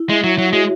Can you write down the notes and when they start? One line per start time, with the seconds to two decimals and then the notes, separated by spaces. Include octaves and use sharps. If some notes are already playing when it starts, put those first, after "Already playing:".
Already playing: E4
0.09 G#3 E5
0.24 F#3 C#5
0.38 F#3
0.48 G#3 F#4